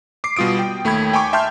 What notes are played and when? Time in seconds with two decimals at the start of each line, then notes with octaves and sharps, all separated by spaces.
0.24 D6 C7
0.37 B2 G3 F4 D#6 D7
0.59 G5
0.85 D#2 A3 G5 B5 G#6
1.13 G5 G#5 B5 C#6 D6
1.33 E5 G5 A5 C6 F6 G6